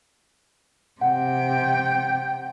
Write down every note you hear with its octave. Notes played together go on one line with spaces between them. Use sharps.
C3 F#5 G5